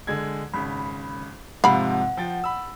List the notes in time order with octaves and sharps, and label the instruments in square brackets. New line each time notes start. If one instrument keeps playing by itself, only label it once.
[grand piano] D3 G#3 G#6
[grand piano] G#1 C#3 [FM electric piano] B5
[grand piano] G#2 C3 F3 [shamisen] F5 B5 [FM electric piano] F#5
[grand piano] F3 G5 A6
B5 E6